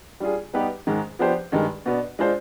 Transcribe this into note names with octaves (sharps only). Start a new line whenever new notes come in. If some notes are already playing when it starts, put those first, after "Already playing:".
G3 D4 F4 G#4
G3 B3 D#4 G4 B4
G#2 D#3 G#3
F3 B3 D4 G4 C5
G2 D#3 G#3
B2 B3 D4
G#3 D4 F4 C5